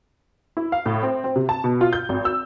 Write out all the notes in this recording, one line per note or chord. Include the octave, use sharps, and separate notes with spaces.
E4
F5
A2
C4
C4
C3
A5
B2
F4
G6
G#1
E6